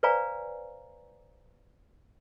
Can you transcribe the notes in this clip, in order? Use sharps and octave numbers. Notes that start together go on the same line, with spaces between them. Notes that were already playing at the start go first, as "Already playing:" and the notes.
B4 C5 D5 F5 G#5 A#5